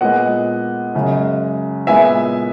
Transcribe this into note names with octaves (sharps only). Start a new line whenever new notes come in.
A#2 G#3 B3 D#5 F#5
F#2 C#3 G#3
A#2 G#3 B3 E5 G#5